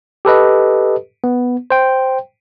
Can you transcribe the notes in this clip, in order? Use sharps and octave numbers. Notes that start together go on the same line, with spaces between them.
G4 A4 B4 D#5
B3
C5 G5